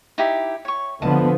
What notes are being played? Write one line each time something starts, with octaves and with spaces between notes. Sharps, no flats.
D#4 E4 G4
C#5 C#6
D3 F3 B3 D#5 A5